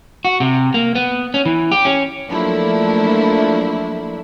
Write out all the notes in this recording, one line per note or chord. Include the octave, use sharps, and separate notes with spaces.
F#4
C3
A#3
B3
C#4
E3
G4
C#4
F3 F#3 A3 A#3 D4 E4